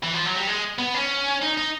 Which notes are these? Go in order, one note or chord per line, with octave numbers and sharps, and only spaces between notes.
E3
F3
F#3
G3
G#3
B3
C#4
D#4
D#4